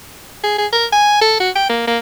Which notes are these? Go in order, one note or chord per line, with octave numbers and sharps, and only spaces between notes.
G#4
G#4
A#4
G#5
A4
F#4
G5
A#3
A#3